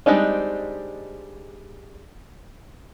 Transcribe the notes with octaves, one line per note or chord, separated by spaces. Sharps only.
G3 G#3 C4 D4 D#4